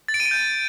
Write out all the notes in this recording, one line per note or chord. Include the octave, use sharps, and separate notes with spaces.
A6
D7
D#7
D7
G6